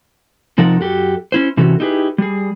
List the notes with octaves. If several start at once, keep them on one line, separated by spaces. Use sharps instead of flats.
C3 F3 D#4 A4 A#4 F#5
F#2 F#4 G4 A4
C#4 E4 C5
C3 E3 C#4 F#4 A4
D#4 E4 G4 G#4 B4
G3 G#4